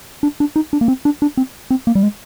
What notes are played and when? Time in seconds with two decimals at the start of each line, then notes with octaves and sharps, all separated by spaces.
0.23 D4
0.40 D4
0.56 D#4
0.73 D4
0.81 A#3
0.88 C4
1.05 D4
1.22 D4
1.37 C4
1.70 C4
1.87 A#3
1.95 G3
2.03 G#3